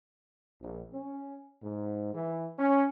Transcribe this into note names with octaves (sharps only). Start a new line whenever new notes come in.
A#1
C#4
G#2
E3
C#4